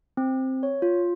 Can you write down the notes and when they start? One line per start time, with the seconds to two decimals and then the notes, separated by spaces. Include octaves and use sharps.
0.17 C4
0.63 C#5
0.82 F4